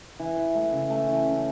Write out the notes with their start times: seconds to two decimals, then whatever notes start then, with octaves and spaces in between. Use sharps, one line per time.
0.20 E3
0.37 E3
0.55 A3
0.72 C#3
0.90 A3
1.08 E3
1.26 C#4